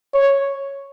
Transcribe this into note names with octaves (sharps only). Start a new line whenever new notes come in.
C#5